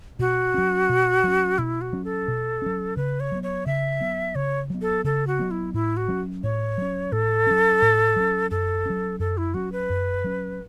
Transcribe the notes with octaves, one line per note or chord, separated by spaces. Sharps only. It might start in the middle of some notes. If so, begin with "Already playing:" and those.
B2 F#4
F#3 C#4
B2
F#3 C#4
B2 E4
F#4
F#3 C#4
A4
B2
F#3 C#4
C#3 B4
C#5
F#3 B3
C#5
C#3 E5
F#3 B3
C#3 C#5
F#3 B3
A4
C#3 A4
F#4
F#3 B3
E4
A2 E4
F#4
F#3 C#4
A2 C#5
F#3 C#4
A2 A4
F#3 C#4
A2
F#3 C#4
F#2 A4
F#3 C#4
F#2 A4
E4
F#3 C#4 F#4
B4
F#2
F#3 C#4